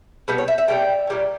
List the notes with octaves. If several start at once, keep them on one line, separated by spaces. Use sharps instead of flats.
B2 G3 B3 B4
C#5
E5
E5
B2 G3 B3 G5
A#2 G3 C#4